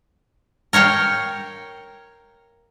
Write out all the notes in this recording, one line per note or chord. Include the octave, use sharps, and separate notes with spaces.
A#4 C#5 F5 G5